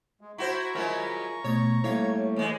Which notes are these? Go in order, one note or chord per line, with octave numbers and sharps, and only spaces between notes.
G#3
E4 F#4 C5 A#5 C#6
F#3 G#3 E4 F4 A#4 E5
B2 A3 C#5
A2 G3 A#3 C#5 F5
E3 G#3